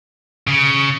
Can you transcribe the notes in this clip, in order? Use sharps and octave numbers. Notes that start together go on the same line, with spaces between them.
C#3